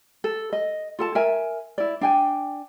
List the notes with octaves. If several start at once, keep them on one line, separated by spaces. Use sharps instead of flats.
A4
D#5
F4 A4 A5
A#4 E5 G#5
E4 D5
D4 G5 G#5